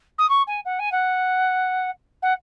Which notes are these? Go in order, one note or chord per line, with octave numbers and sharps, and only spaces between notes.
D#6
C#6
G#5
F#5
G#5
F#5
F#5